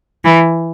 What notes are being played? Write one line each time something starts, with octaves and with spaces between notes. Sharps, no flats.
E3